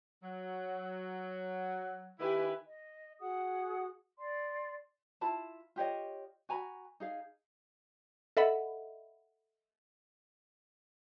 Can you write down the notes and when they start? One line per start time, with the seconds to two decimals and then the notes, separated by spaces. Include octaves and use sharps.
0.23 F#3
2.19 D#3 E4 G4 B4 G#5
2.67 D#5
3.20 F#4 G#4 F#5 D#6
4.19 D5 C6
5.21 E4 F4 A5 B5
5.76 F4 G4 C#5 D#5
6.49 F#4 G#5 A#5 B5
7.00 D#4 G#4 F5
8.37 A4 D#5 E5 F#5 B5